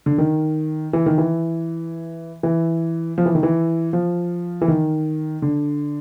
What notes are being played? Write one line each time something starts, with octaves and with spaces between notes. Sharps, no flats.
D3
D#3
E3
D#3
E3
E3
F3
E3
D#3
E3
F3
E3
D#3
D3